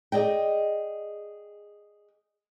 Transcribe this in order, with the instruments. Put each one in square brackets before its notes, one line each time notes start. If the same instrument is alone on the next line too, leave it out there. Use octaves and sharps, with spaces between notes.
[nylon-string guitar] G#4 D5 D#5 G5